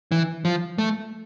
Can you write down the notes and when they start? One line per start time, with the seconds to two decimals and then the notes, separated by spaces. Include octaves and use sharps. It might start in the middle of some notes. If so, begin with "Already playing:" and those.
0.12 E3
0.45 F3
0.78 A3